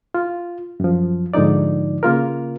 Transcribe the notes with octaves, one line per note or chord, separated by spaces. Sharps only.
F4
F#2 F3
G#2 D3 F3 D#4 D5
C#3 A#3 F4 A#4